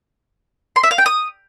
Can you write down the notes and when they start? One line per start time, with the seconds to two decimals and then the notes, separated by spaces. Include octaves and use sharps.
0.76 C6
0.83 E5
0.91 F5
0.98 G5
1.06 D#6